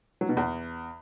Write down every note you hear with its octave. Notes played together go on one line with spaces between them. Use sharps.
F#3
B2
E2